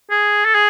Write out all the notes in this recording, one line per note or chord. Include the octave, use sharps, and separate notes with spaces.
G#4
A4
G#4